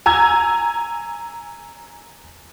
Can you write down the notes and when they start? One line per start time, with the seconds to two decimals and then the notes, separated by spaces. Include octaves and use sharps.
0.06 G#5 A#5 E6 G#6